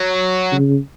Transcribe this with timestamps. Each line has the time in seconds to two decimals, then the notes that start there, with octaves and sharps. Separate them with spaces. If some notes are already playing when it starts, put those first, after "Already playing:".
Already playing: F#3
0.52 C#3